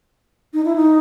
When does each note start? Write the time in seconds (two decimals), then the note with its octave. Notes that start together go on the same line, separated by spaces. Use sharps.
0.53 D#4
0.65 E4
0.76 D#4